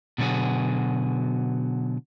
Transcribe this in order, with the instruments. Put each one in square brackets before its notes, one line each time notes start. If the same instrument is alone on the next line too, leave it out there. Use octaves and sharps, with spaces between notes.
[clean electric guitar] B2 D3 F#3 B3 F#4 G#4